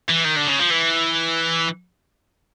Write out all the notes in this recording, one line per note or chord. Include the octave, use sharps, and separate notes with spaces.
E3
D#3
D3
C#3
F3
E3